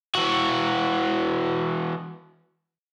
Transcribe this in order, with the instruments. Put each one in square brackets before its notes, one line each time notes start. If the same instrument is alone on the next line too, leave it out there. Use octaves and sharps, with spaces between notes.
[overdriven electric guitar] E3 F#4